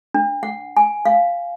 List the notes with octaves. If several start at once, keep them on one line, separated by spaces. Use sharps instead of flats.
D4
F#5
G#5
F5